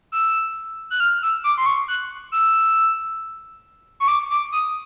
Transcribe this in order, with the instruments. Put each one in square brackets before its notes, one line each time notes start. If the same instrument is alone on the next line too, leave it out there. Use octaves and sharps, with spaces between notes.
[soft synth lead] E6
F#6
F6
E6
D6
C6
C#6
F#6
E6
C#6
D6
D6
D#6